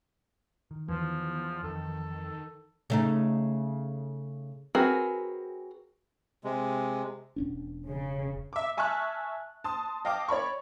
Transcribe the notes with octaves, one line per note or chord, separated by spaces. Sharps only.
D#3
E2 E3 F3
F2 D#3 A4
C#3 A3 D#4
C4 F#4 G#4 A#4 B4
C3 G#3
E1 C#4 D4
C#3
E5 D6
E5 G#5 A5 C#6 F6 F#6
A5 C6 D#6
D#5 F5 G5 A5 D6
C#5 D5 B5 C#6